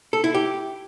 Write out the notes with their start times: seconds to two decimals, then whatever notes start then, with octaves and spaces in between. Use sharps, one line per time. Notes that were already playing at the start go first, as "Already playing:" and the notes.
0.13 A4
0.24 E4
0.34 G4